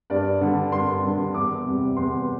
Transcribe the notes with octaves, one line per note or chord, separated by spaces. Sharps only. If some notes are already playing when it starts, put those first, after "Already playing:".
G2 D5
D3 G3
G2 C6
D3 G3
E2 D6
C3 G3
E2 C6